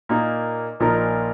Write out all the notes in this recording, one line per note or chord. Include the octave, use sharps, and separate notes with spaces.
A#2 A#3 D#4
A#1 A#2 F3 D#4 A#4